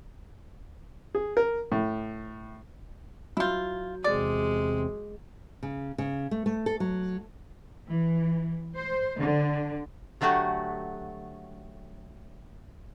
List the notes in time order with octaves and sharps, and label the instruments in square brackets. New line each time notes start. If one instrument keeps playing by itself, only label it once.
[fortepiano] G#4
A#4
A2
[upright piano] F#3 G6 [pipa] E4 F4
[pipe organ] E2 C3 C4 [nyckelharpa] G#3 [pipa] D5
[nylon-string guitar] C#3
C#3
A3
A3
A4
F#3
[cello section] E3
C5
D3
[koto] D3 F#3 A3 F#4 G4